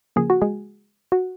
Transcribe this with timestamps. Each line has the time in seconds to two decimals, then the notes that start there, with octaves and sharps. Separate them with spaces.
0.16 C#3 F3 A#3 G#4
0.30 F#4
0.42 G#3 G#4
1.12 F#4